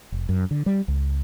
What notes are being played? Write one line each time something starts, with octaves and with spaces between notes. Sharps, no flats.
F1
F#2
D3
G3
C#2